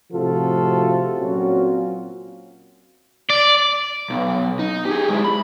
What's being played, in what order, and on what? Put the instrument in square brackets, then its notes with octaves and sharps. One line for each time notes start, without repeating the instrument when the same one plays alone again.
[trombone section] A2 C3 F3 F4 F#4 A4
A#2 F#3 C4 C#4 F4 F#4
[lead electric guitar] D5
[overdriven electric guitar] B1
D#4
G4 G#4
G#3 E4
B5